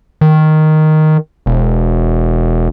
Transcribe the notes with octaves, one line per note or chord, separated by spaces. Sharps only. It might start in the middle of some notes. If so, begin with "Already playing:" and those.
D#3
E1